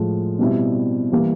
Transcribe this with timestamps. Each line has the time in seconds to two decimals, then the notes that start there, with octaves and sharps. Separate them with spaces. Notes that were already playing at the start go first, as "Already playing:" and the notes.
Already playing: A2 F3 G#3
0.39 B2 G3 C4 E4
1.12 E3 G3 A#3